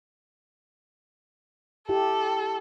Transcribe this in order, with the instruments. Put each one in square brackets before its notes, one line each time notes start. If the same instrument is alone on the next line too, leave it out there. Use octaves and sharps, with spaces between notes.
[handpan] E4 G4 [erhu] A4